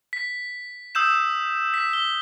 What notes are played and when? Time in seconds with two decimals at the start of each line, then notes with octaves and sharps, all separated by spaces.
0.13 B6
0.95 D#6 E6 G6 E7
1.74 B6
1.93 G7